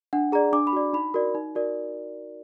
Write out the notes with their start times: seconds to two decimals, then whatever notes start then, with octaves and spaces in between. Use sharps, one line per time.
0.13 D4 F#5
0.32 G#4 D5 A#5
0.53 D4 D6
0.67 B5
0.73 F#4 D5
0.93 D#4 B5
1.14 F#4 A#4 D5
1.35 D#4
1.55 F#4 A#4 D5